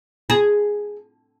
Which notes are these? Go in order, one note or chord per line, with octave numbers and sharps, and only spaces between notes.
G#4